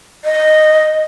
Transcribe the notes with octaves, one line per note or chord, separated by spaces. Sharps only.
D#5